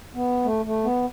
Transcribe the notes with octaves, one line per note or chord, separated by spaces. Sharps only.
B3
A3
A3
B3